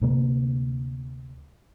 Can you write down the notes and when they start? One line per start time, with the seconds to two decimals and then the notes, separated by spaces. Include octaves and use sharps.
0.02 D2 C3 A#3